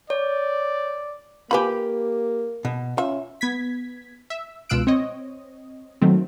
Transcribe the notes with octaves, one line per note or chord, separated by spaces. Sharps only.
C#5 D5
A#3 F4 G4 B4 G#5 B5
B2
C#4 F4 E5
B3 G#6 B6
E5
C#2 B2 F4 E6 F#6 D7
C4 C#5 D#5
D#3 F#3 A3 C4